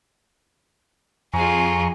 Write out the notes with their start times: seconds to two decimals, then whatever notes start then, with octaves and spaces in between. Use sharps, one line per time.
1.34 F2 F4 G#4 G#5 A#5 C#6